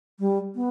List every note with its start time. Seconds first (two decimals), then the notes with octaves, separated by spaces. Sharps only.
0.19 G3
0.55 B3